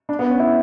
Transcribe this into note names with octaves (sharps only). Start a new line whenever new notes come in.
D4
B3
C#4
E4